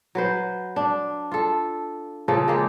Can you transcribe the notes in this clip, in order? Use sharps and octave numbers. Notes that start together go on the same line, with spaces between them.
F#3 B4 C5
D4
F4 A4
C#3 F3 A#3 A4
G#3 A#3 G4